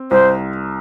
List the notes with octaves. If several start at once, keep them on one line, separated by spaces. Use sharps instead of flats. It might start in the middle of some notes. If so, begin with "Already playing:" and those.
Already playing: C4
C2 C5